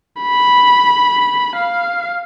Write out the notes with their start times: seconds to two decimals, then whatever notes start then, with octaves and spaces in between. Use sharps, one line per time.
0.22 B5
1.56 F5